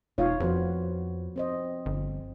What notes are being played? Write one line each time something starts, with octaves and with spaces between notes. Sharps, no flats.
E1 D#4 F4 C#5 F5
F2 F3 B3 F#4 C5
C4 C5 D#5
G1